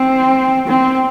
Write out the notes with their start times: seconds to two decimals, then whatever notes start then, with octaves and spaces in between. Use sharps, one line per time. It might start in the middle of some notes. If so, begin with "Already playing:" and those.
Already playing: C4
0.68 C4